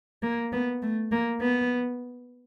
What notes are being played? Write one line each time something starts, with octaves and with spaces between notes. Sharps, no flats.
A#3
B3
A3
A#3
B3